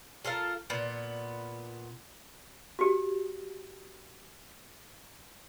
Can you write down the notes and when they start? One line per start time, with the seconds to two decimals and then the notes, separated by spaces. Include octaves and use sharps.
0.25 F4 A4 A#4 F5
0.70 A#2 B3
2.79 F#4 G4